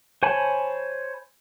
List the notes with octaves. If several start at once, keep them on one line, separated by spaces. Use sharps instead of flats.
C5 C#5 G#5 A5 B5